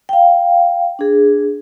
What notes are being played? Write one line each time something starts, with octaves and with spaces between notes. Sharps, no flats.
F5 G5
D4 G#4